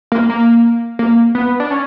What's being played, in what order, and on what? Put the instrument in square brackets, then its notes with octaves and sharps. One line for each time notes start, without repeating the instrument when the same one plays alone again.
[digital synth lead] A#3
A#3
A#3
B3
D4
C#4